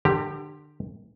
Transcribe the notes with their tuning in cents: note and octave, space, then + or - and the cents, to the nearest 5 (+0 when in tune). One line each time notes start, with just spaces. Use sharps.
D3 +35 G4 +0 A#5 -25